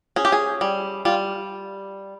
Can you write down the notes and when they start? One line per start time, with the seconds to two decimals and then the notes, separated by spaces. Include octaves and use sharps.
0.16 C#4 G#4
0.25 G4
0.32 G#4
0.61 G3
1.05 G3 F4